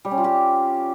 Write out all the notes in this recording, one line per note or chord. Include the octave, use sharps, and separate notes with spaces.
G3
C#4
F4
G4